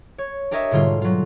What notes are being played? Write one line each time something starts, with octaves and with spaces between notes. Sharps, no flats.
C#5
D4 G4 A#4 C#5 D#5 E5
G#2 B2 D3 G3 F4
F#3 F4